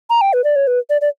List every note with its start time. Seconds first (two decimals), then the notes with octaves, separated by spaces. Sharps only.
0.10 A#5
0.21 G5
0.33 B4
0.44 D5
0.56 C#5
0.67 B4
0.90 D5
1.01 D5